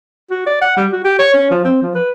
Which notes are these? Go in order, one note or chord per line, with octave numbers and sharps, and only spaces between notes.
F#4
D5
F#5
G3
F#4
G4
C#5
C#4
F3
C4
F3
B4